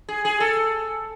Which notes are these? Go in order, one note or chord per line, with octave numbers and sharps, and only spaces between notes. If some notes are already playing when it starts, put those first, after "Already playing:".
G#4
G#4
A4